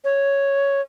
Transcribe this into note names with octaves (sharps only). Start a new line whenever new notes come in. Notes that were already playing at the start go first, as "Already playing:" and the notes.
C#5